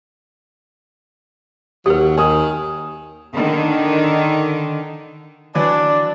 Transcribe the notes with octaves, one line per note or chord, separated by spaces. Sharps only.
D#2 F#3 G4 A#4
D#3 G#5 D#6
D3 D#3
E3 F#3 D4 B4 D5